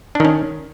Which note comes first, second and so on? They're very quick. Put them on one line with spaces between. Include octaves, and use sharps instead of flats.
D4 D#3 C#4